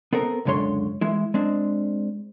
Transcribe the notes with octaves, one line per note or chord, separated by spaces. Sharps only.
B3 C4 A4 A#4
C#2 F#2 D3 G#3 C#5 C6
E3 G#3 E4
G#3 C4 D4